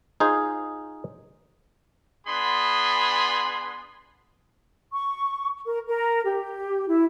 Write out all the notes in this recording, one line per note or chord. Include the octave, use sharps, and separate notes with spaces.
D#4 F4 G#4 C5
B3 D4 G#4 B5 C6
C#6
A#4
A#4
G4
E4